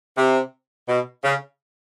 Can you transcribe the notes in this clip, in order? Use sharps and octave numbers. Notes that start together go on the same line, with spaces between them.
C3
B2
C#3